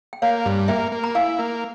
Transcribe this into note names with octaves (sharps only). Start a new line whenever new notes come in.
G5
A#3 C#5 F5
G2
A#3 E5 G5
A#3
A#5
E4 F5 G#5
A#3